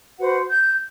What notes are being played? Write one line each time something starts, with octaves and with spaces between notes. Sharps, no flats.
F#4 B4 C5 F#5
G6